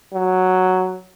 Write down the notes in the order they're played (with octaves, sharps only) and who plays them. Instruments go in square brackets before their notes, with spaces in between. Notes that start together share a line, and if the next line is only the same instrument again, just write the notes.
[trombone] F#3